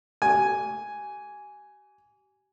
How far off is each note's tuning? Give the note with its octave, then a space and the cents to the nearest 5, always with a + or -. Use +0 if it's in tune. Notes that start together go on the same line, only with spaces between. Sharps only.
G4 -35 G#5 +0